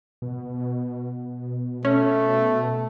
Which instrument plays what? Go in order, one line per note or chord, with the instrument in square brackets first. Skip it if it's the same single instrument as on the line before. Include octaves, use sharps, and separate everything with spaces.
[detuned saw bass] B2
[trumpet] A3 [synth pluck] C#4